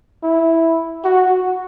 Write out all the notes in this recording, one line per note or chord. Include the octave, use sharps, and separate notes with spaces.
E4
F#4